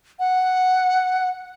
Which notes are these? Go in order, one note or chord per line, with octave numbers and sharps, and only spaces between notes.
F#5